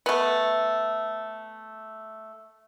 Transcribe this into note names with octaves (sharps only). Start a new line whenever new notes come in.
A3 B3